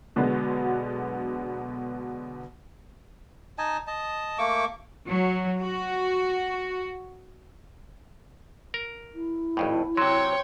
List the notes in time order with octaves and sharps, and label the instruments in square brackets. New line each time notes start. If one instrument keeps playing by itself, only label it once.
[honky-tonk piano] B2 D3 F#3 G#3 B3
[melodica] D#4 D#5 G#5 A5
D#5 A5
A3 A#3 C#6 D6
[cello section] F#3
F#4
[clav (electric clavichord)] A#4
[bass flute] E4
[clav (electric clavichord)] G#1 F2 A2
[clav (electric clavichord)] C3 F#3 [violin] C#5 G5 [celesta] C6